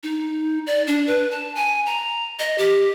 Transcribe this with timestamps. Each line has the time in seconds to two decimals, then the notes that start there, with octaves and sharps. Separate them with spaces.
0.03 D#4
0.67 D5
0.87 D4
1.07 B4
1.31 A5
1.55 G#5
1.86 A#5
2.39 D#5
2.58 G4